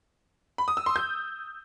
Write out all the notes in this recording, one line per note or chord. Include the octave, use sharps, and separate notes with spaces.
B5
D#6
E6
C6
G6